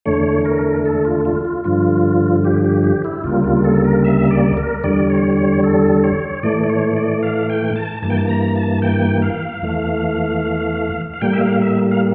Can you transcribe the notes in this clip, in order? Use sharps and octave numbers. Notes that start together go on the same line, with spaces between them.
E2 D3 A3 C#5
A#4
A4
F4
F4
F4
G2 D3 F3 F4
G4
G4
G4
E4
D2 C#3 G3 A#3 F4
F4
A4
A#4
E5
D5
A#4
E2 D3 G3 D5
C#5
C#5
A4
C#5
A2 E3 A3 D5
D5
C#5
D5
F5
G5
A5
G2 E3 A#3 A5
G5
A5
A#5
A5
G5
F5
E2 E3 A3
F5
A2 G3 A#3 G5
E5
F5
E5
F5